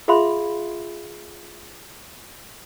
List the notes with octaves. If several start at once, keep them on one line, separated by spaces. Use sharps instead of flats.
F4 G#4 E5 F5 B5 C6